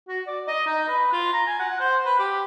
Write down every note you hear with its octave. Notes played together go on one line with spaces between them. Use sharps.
F#4
D5
D#5
D#4
B4
F4
A#5
G#5
F#5
C5
B4
G4